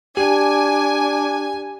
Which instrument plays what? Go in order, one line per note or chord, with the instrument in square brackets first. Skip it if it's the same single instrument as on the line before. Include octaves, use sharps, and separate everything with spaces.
[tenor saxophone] D4 [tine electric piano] G4 [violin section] G#5